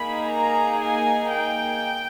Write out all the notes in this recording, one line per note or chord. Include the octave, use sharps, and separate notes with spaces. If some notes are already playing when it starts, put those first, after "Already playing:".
Already playing: A#3 D#4 G#4 B5
A#5
G#5
G5